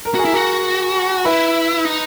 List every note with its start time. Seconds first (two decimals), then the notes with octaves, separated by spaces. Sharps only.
0.05 A#4
0.15 F#4 G#4
0.25 E4
0.32 F#4 A#4
1.25 E4 B4
1.85 D#4